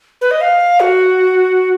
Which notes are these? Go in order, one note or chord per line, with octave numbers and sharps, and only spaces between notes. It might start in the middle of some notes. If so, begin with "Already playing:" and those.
B4
D#5
F5
F#4